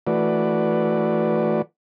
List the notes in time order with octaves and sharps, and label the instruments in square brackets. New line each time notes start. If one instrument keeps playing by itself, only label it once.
[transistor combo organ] E3 A3 F#4 B4 D5